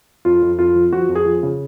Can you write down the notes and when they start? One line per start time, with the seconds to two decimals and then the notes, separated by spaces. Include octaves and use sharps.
0.25 F2 F4
0.42 F2
0.59 F2 F4
0.76 F3
0.93 F3 F#4
1.09 F2
1.15 G#4
1.26 F3
1.43 C#3